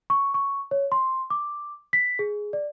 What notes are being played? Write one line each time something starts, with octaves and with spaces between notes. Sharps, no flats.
C#6
C#6
C#5
C6
D6
B6
G#4
D5